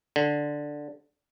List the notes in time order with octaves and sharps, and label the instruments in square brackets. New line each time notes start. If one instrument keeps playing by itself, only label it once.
[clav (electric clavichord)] D3